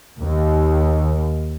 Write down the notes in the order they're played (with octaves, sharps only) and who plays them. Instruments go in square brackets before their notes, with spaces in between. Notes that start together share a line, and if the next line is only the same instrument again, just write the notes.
[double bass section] D#2